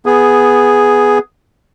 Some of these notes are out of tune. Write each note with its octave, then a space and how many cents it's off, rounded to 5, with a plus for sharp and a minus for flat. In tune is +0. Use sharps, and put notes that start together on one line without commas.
B3 +0 G#4 +0